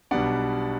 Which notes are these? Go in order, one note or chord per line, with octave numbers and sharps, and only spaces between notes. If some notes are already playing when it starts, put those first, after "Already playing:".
B1 B2 G3 B3 D4 D5 F#5